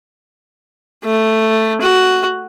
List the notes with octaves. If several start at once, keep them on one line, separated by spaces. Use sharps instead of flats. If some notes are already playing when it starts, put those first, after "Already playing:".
A3
F#4